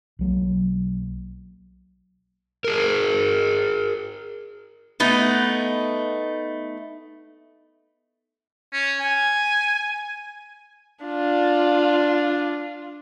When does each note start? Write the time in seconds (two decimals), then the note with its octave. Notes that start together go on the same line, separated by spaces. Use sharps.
0.19 B1 F#3 A#3
2.64 G#4 A#4
5.00 A3 B3 D#4
8.73 C#4
9.00 G#5
11.05 D4 F4